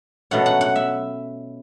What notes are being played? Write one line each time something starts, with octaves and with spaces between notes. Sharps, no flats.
B2 F#3 A3 C#4 F#5
F#5
F#5
E5